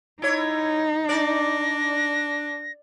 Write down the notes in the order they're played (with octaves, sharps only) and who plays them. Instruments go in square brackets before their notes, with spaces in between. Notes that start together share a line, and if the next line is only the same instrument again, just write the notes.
[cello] D#4 [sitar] E4 C#5
[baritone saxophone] D4 [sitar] D5 [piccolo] A#6